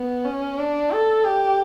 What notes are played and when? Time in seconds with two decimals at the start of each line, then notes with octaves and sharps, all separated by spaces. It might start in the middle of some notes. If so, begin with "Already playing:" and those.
Already playing: B3
0.25 C#4
0.58 D4
0.91 A4
1.25 G4